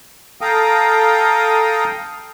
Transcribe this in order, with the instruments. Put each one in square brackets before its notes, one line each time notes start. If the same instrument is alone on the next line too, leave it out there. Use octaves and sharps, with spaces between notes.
[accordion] A4 F5 G5 A#5 D#6